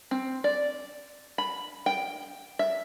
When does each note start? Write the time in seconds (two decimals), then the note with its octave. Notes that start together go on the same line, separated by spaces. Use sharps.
0.11 C4
0.44 D5
1.38 B5
1.86 G5
2.59 E5